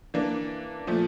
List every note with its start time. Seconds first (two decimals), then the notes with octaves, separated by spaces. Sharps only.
0.14 E3 A#3 D4
0.87 A#2 F3 A3